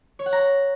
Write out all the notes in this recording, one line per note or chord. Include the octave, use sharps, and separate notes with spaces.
C#5
F#5
A#5